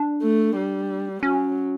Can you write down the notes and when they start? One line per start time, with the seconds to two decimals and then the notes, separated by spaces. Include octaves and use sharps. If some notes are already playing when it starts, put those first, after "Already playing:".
Already playing: D4
0.22 A3
0.56 G3
1.23 F#3 C#4